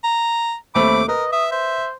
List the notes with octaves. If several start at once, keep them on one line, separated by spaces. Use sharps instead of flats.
A#5
D#2 A3 C4 B5 D6
A#4 B4 D#5
E5 D#6
C5 E5